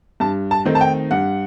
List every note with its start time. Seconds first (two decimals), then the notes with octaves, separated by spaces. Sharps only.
0.20 G2 A5
0.51 A5
0.65 D#3 A3 C4 D#4
0.75 A5
0.81 G5
1.11 G2 F#5